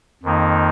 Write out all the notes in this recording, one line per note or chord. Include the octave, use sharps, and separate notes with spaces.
F2 D#3 A#3 D#4